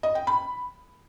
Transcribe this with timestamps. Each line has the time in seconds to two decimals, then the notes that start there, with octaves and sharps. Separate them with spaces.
0.03 D#5
0.15 G5
0.27 B5